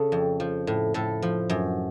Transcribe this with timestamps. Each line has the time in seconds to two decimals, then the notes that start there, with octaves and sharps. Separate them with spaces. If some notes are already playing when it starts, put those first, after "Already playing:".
Already playing: C#3 A4
0.12 F2
0.40 F3
0.67 A2
0.94 A2 A4
1.22 F3
1.50 F#2